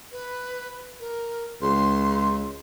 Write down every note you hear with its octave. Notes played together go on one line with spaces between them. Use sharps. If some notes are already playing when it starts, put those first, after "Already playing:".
B4
A#4
C#2 C6